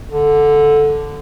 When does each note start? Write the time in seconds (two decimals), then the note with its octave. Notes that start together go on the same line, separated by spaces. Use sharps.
0.10 D3